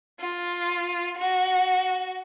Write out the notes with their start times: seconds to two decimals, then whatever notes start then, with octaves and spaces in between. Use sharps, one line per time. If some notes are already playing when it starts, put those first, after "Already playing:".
0.21 F4
1.18 F#4